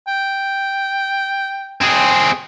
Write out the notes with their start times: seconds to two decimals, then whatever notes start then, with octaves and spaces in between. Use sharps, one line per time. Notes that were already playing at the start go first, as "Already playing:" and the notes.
0.08 G5
1.81 C4 G#4